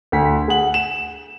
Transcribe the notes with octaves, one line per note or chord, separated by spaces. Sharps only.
D2 B6
G#4 F#5 F#7
E7